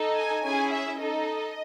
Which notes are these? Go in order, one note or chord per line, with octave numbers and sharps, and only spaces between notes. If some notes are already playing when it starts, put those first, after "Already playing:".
Already playing: D#4 A4
G#5
C#4 E4 G#4 G#5
E5
D#4 A4 D#5